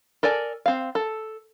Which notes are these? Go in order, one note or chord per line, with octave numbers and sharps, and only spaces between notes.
A4 A#4 D5 G#5
C4 F5
A4